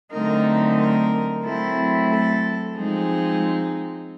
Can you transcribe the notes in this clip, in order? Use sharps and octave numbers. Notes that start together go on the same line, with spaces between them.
D3 F#3 A3 C4 D#4 A#4
A#4
F#3 A3 C4 E4 A4
A4
F3 G#3 C4 D#4 G#4